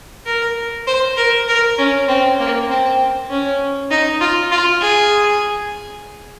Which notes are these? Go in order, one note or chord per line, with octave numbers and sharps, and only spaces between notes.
A#4
C5
A#4
A#4
C#4
C4
A#3
C4
C#4
D#4
F4
F4
G#4